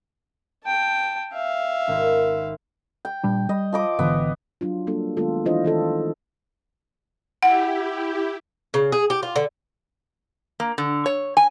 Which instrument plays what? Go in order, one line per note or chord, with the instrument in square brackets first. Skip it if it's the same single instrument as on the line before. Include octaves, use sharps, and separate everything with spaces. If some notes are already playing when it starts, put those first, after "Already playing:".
[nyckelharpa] G5 A5
E5 F5
[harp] G#1 A#4
[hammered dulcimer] G5
[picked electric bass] A#2 G3 D4
[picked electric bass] G3 [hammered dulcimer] D#5
[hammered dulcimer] F3 D#5 D6
[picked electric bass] G#1 D3 E3 [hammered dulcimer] B3
[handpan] F#3 D4 F4
G3 A#3 D4 A4
D#3 G#3 A3 B3 F4 A4
E3 D4 E4 F4 C5 D#5
D#3 F4 A4
[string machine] E4 G4 [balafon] F#5
[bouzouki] C#3
G#4
G4
F4
D3
[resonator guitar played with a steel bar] A#3
D3
C#5
G#5